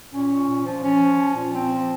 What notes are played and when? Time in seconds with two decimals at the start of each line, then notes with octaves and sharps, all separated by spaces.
0.13 A#2 C#4
0.31 A#2
0.49 A#2
0.65 F3
0.83 F3 C#4
1.00 F3
1.17 F3
1.35 A#2
1.53 F3 C4
1.71 F3